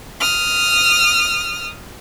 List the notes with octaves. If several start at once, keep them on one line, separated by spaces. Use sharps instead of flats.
D#6 F6